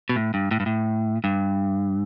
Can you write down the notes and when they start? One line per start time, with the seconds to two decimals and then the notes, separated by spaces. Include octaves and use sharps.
0.09 B2
0.16 A2
0.34 G2
0.51 A2
0.60 G2
0.66 A2
1.24 G2